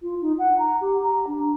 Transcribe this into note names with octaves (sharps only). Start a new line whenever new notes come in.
F4
D#4
F#5
A#5
G4
A#5
D4